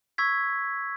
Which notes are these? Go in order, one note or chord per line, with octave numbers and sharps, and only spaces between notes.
C#6 E6 G#6 B6